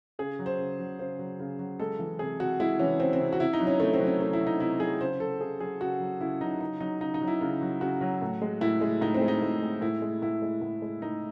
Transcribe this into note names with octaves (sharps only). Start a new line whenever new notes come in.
C#3 G#4
F#3
C5
C#3
F#3
C#3 C5
F#3
C#3
F#3
G#3 A4
E3
C3 G#4
C3 F#4
G#3 E4
E3 C#4
C3 C4
C4
C3
F#4
C3 E4
D#4
F#3
C#4
C3 A3
C4
F#3
C#4
C3 A3
E4
F#3
D#4
C3 E4
F#3 G#4
C#3 C5
F#3 A4
C#3 G#4
F#3 G#4
C#3 F#4
F#3
C#3 E4
F#3 D#4
C#3 D#4
F#3 D#4
C#3 D#4
D#4
F#3
E4
C#3
F#3
C#3 F#4
F#3
A2
G#3
A2 E4
G#3
A2 D#4
C4
G#3
D#4
A2
G#3
A2 E4
G#3
A2 E4
G#3
A2
G#3
A2 D#4